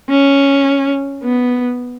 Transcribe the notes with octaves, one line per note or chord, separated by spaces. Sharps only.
C#4
B3